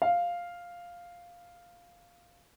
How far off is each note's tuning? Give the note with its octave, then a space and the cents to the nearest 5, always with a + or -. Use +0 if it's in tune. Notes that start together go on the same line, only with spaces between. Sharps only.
F5 +0